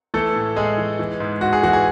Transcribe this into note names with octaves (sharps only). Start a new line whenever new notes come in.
E3 A3 A4
A2
A2 G#3 G#4
E3
E3
G#2
G#2 F#4
G#4
E3 F#4
G#4